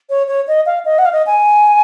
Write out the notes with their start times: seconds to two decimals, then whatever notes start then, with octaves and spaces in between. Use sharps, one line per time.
0.10 C#5
0.28 C#5
0.48 D#5
0.66 F5
0.85 D#5
0.98 F#5
1.05 F5
1.12 D#5
1.26 G#5